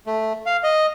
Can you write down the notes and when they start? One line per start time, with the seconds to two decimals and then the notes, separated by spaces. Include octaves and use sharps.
0.07 A3
0.46 F5
0.64 D#5